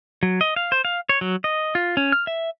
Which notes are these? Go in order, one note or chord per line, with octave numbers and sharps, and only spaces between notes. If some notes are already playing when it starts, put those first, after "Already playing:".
F#3
D#5
F5
C5
F5
C#5
F#3
D#5
F4
C#4
F6
E5